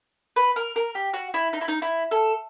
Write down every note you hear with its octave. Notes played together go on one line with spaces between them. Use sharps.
B4
A#4
A#4
G4
F#4
E4
D#4
E4
D#4
E4
A4